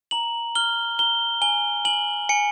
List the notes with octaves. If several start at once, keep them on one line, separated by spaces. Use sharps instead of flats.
A#5 F#7
F6 G7
A#5 G7
G#5 G7
G#5 F#7
G#5 C#7